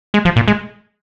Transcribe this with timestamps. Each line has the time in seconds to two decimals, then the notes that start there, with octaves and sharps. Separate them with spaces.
0.14 G#3
0.25 F3
0.36 A#2
0.48 G#3